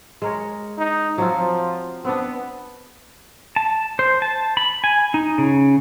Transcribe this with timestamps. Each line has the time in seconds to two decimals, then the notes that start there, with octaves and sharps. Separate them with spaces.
0.22 G#3 A#4 C#5
0.78 D#4
1.18 F3 F#3 C4 F4
2.05 B3 C4 D4
3.56 A5
3.99 C5
4.22 A5
4.57 B5
4.84 G#5
5.14 D#4
5.38 C#3